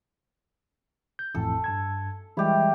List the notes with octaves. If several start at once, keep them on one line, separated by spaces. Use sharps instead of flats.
G6
A1 F2 A2 A4
G2 A5 G#6
E3 G3 G#3 E4 G4